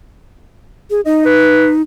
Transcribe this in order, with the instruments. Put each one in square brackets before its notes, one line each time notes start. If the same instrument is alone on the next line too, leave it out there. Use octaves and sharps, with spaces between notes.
[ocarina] G#4
[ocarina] D#4 [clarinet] D#5
[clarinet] B4